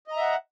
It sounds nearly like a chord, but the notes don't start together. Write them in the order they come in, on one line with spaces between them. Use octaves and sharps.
D#5 A#5 E5 F#5